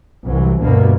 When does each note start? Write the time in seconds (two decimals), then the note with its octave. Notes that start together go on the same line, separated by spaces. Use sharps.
0.24 C2 E3 F#3
0.60 D2 G2 B2 A#3 B3